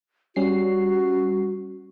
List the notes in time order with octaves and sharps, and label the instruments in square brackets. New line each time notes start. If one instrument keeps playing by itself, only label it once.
[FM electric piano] G3 C#4 C7 [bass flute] F#4